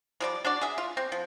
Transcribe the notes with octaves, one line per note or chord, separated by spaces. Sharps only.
F3 G3 D5
D4 F#4 D5
G#4 E5
F4
C4
F3